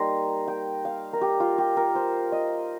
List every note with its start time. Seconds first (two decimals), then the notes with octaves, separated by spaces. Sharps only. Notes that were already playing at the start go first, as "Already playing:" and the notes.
Already playing: G3 A#3 D#4 A#5 C6
0.48 G5
0.85 F5
1.13 A#4
1.21 G4
1.40 F4
1.58 G4
1.77 A#4
1.95 C5
2.32 D#5